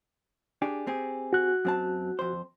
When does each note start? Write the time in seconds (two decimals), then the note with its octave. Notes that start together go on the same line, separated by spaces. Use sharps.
0.62 D4 G4 G#4
0.87 C4 G4 G#4
1.33 F#4 F#6
1.65 F#2 C4 A5
2.19 F2 C5